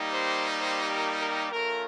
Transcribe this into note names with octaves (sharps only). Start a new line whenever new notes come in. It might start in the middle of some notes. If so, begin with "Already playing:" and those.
Already playing: G3 A#3 D#4 G4
C5
C5
A#4
A#4
A3 C#4 F4 A#4